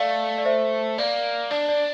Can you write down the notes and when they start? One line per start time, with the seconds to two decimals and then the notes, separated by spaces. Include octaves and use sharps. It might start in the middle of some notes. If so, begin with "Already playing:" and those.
Already playing: A3 D5 F5
0.38 D5
0.45 C5 E5
0.98 A#3 D5
1.51 D4 D5
1.69 D5